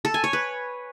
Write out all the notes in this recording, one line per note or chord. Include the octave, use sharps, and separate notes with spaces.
A4
G#5
C#5
B4